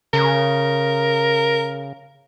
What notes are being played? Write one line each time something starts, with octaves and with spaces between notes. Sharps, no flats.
C#3 A#4